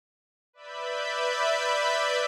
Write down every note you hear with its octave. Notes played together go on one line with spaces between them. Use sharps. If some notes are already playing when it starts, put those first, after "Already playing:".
B4 D5 E5 B5 G6